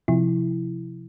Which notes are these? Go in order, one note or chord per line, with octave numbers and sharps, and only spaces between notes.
C3 F3 E4